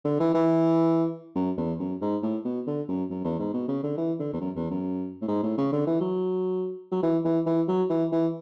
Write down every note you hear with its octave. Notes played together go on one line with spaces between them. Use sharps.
D3
E3
E3
F#2
E2
F#2
G#2
A2
B2
D3
F#2
F#2
E2
G#2
B2
C#3
D3
E3
D3
E2
F#2
E2
F#2
A2
G#2
A2
C#3
D3
E3
F#3
F#3
E3
E3
E3
F#3
E3
E3